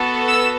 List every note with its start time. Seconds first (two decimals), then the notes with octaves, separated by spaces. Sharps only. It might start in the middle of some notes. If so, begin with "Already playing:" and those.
Already playing: B3 F#4 A4
0.27 E6